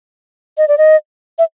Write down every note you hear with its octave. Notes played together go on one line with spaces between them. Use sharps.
D#5
D5
D#5
E5